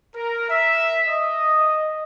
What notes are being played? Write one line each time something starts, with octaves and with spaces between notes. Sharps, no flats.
A#4
E5
D#5